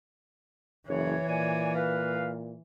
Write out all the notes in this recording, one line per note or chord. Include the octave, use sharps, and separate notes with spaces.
F#1 E3 C#5
A#2 C#5 D5 G#5
B4 F5